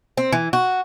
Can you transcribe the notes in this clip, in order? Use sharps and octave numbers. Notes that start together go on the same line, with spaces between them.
C4
E3
F#4